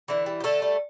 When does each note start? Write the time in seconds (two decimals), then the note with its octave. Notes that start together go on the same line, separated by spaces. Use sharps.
0.08 D3 E3 E4
0.26 G3
0.40 G4
0.44 D3 A3 A4
0.62 G3